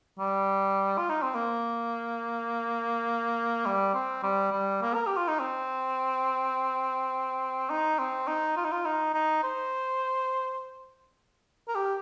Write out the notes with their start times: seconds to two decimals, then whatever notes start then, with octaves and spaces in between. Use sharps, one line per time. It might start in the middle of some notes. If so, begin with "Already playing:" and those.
0.19 G3
0.97 F4
1.09 D#4
1.23 C4
1.35 A#3
3.66 G3
3.94 C4
4.23 G3
4.52 G3
4.82 A#3
4.94 A#4
5.07 G4
5.17 F4
5.28 D#4
5.40 C4
7.70 D#4
7.99 C4
8.27 D#4
8.56 F4
8.64 D#4
8.72 F4
8.85 D#4
9.14 D#4
9.43 C5
11.68 A#4
11.75 G4